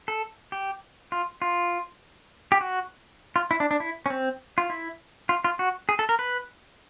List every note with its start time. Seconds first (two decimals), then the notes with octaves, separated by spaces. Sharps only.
0.08 A4
0.52 G4
1.12 F4
1.42 F4
2.52 G4
2.61 F#4
3.36 F4
3.51 E4
3.60 D4
3.71 D4
3.80 E4
4.06 C#4
4.10 C4
4.58 F4
4.70 E4
5.29 F4
5.44 F4
5.59 F#4
5.89 G#4
5.99 A4
6.09 A#4
6.19 B4